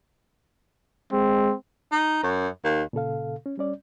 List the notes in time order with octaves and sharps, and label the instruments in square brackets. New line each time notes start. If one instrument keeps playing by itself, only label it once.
[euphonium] G#3 [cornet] C4
[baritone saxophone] D#4
F#2
D#2
[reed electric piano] A#2 C#3 A4 F5
C#4
G3 C#4 D5